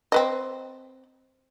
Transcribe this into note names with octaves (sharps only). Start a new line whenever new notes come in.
C4 B4 D#5